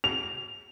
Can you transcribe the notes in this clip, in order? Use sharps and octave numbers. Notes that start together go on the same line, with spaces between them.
F7